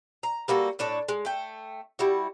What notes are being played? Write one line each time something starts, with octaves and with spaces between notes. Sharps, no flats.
A#5
G3 A#3 F#4 A4
A2 D4 A4 C#5
G#3
A3 G5
G3 E4 F#4